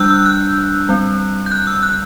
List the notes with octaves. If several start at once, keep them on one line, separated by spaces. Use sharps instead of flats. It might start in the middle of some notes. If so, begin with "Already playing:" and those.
Already playing: G3 D4 E6 F#6 G6
E6
F#6
G3 C4
G6
F#6
E6
F#6